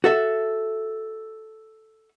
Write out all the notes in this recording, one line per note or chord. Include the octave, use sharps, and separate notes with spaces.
F#4 A4 E5